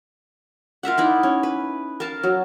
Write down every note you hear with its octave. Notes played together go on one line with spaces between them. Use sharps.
F4 A#4 E5 F#5
D#4 E4 D5
C#4
B4
A#4 F5 A5
F#3